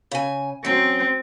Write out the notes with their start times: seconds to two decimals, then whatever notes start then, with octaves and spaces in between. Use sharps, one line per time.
0.11 C#3 G#5
0.65 F#3 C4 C#4